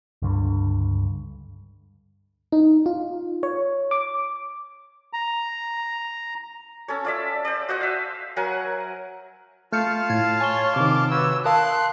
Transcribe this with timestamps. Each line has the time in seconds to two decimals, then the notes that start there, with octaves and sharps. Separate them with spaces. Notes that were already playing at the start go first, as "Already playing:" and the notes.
0.22 C#2 G2 D3
2.52 D#4
2.86 F4
3.43 C#5
3.91 D6
5.13 A#5
6.88 C#4 A4 C#5
7.04 F4 D5 E5
7.45 C5 D5
7.69 F#4 C5 D#5 F#5
7.81 E5 F5
8.36 F#3 A#4 F#5 G#5
9.73 A3 F4 F5 A5 F6 G6 C#7
10.10 A2 G#6
10.40 C#5 G#5 G7
10.76 C3 D#3 D6
11.11 F#4 B4 C#5 E6
11.45 A#4 F5 A5 C6 D#6 F#6